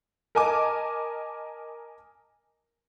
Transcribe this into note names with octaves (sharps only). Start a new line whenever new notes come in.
A#4 D#5 G#5 A5 D6